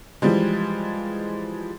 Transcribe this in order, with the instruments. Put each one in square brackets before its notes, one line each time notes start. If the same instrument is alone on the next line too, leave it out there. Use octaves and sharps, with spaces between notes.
[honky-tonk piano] E3 F3 G3 G#3